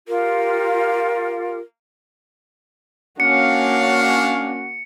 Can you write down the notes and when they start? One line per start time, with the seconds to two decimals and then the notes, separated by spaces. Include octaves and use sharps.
0.08 F4 G4 A#4
3.20 A#3 C#4 D4 F#4 F5 C#7